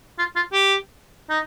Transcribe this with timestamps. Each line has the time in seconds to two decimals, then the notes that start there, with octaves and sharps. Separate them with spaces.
0.19 F4
0.36 F4
0.53 G4
1.30 D#4